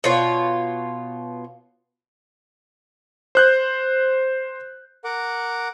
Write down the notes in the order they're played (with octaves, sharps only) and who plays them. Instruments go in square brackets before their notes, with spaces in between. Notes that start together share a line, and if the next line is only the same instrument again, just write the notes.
[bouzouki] B2 F4 C#5
[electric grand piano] C5 F#6 G6
[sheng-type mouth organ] A#4 F#5 D6